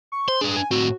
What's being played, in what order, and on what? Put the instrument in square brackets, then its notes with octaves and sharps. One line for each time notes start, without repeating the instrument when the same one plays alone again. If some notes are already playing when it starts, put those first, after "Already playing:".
[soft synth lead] C#6
[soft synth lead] C5 [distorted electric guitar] C6
[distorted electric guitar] D4 B4 [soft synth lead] G#4
[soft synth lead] G#5
[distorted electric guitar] A2 C4 [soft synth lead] F#4